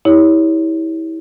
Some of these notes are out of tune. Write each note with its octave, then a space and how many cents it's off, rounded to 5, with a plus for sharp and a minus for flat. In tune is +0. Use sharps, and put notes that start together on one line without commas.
E4 -30 G4 +25 C#5 +20